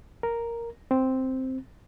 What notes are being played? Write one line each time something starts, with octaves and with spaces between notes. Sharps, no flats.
A#4
C4